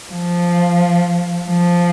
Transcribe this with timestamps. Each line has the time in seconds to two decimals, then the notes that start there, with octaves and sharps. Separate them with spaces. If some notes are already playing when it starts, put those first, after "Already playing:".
0.12 F3
1.49 F3